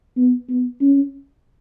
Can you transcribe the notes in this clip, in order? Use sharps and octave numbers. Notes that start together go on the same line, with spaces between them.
B3
B3
C#4